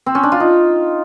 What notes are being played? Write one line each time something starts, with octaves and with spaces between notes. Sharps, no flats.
C4
C#4
D4
F4
D#4